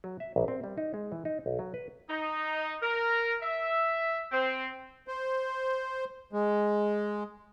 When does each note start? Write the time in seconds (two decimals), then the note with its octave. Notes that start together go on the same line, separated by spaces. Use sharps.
0.04 F#3
0.20 E5
0.36 A#1
0.48 C4
0.64 G3
0.78 D#4
0.94 G#3
1.12 E3
1.25 D#4
1.46 B1
1.59 F#3
1.74 B4
2.09 D#4
2.81 A#4
3.42 E5
4.31 C4
5.08 C5
6.33 G#3